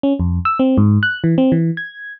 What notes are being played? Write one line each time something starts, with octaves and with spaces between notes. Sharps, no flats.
C#4
F2
E6
C4
G#2
F#6
E3
C4
E3
G#6